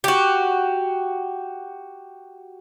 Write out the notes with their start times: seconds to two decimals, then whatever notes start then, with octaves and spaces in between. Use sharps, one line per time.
0.04 F#4 G4